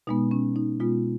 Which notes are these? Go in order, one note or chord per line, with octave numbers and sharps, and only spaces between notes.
B2 G#3 B3 D#4
C#4
D#4
B2 G#3 B3 F4